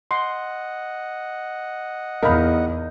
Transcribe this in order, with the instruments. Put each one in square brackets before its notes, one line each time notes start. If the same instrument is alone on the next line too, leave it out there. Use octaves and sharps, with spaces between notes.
[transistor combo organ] D#5 F#5 [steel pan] C6
[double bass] E2 [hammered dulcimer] D#4 [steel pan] A#4 F5 B5